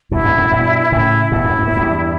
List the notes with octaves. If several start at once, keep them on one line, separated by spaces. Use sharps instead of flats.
G2 B2 E4
G2 B2
F#2 A2
G2 B2
A2 C#3 E4
G2 B2 E4
F#2 A2
G2
A2
E2 G2